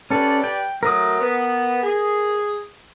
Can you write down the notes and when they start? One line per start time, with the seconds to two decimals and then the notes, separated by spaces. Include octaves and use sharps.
0.10 C#4 G4 A4 B4 D5
0.44 G5
0.83 F#3 A3 A#4 D#6
1.20 B3
1.83 G#4